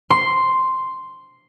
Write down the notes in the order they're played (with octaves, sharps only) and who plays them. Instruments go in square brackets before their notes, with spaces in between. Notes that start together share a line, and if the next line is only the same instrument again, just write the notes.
[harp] C6